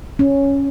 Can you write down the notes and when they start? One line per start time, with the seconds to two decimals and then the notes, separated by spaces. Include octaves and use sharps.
0.19 C#4